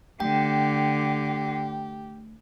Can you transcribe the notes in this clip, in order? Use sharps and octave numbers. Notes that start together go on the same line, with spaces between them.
D3 A3 G4 G5